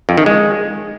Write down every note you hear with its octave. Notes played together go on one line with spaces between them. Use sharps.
F2
D#3
G#3